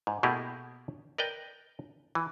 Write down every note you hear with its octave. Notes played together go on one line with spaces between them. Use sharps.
G#2
B2 A3 A#3 E4 G4 G#4
A#4 B4 D5 D#5 G5
E3